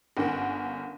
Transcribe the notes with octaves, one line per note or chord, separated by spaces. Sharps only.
G1 A#3 C#4 F#5